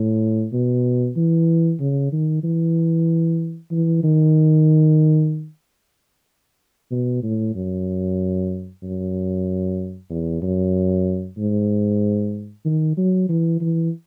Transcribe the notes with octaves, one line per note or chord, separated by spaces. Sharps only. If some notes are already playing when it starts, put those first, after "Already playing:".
Already playing: A2
B2
E3
C#3
D#3
E3
E3
D#3
B2
A2
F#2
F#2
E2
F#2
G#2
D#3
F#3
E3
E3